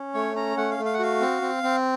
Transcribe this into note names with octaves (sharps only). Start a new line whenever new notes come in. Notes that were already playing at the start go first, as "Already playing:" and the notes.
Already playing: C#4
A3 C#5
C#4 A#5
A3 F#5
F5
A3
F5
F#5
F#4 F5
C4
C4
C4